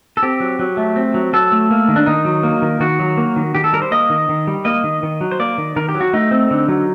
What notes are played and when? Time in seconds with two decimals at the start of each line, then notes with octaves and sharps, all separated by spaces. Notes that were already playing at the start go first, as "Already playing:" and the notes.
0.17 A4
0.23 C4 G4
0.40 F#3
0.59 F#3
0.77 A3
0.96 C4
1.14 F#3
1.33 F#3 A4
1.52 A3
1.71 A#3
1.88 D#3
1.96 D4
2.06 D#3 D#4
2.25 F#3
2.43 A#3
2.62 D#3
2.80 D#3 F#4
2.99 F#3
3.17 A#3
3.36 D#3
3.55 D#3 G4
3.64 A4
3.73 G3 A#4
3.82 C5
3.91 A#3 D#5
4.10 D#3
4.29 D#3
4.47 G3
4.65 A#3 D#5
4.84 D#3
5.03 D#3
5.21 F#3
5.31 C5
5.39 A#3 D5
5.58 D#3
5.76 D#3 A#4
5.89 G4
5.94 F#3
6.01 F#4
6.13 A3 D#4
6.31 C4
6.51 D3
6.68 F#3